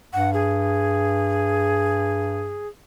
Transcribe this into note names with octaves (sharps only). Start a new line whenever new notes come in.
G2 F#5
G#4